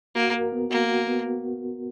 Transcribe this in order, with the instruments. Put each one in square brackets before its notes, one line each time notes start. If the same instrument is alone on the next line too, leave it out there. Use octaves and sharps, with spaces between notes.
[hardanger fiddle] A#3 [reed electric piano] F#4
[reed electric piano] A#4
B3
[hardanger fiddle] A#3 [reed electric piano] F#4
[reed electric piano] F#4
B3